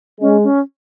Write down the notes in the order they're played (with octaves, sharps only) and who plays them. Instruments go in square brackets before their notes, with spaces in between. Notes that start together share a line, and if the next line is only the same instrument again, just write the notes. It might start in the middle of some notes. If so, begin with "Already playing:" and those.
[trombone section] G#3 [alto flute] C#4
[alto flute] C#4